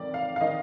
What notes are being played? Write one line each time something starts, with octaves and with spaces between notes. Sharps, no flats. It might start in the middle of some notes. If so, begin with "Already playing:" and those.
Already playing: F2 D#3 D5
F5
F5
D#3 D#5